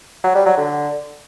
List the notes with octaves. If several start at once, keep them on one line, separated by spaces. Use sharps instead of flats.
F#3
G3
F#3
D3